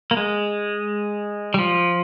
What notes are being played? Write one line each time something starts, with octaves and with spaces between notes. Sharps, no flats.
A#3
G#3
G3
F3